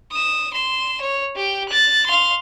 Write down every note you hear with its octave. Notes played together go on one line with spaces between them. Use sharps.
D#6 E7
C6 E7
C#5
G4 G5
F#6 A6
F5 C6